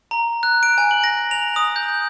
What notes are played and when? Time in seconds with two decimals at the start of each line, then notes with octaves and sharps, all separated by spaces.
0.11 A#5
0.43 F#6
0.63 D7
0.78 G#5
0.91 F#7
1.04 A#6
1.31 F7
1.56 D#6
1.76 G6